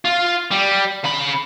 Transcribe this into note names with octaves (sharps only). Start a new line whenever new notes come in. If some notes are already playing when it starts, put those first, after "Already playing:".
F4
G3
C#3 B5